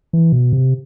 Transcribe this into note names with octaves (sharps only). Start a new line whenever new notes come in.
E3
B2
C3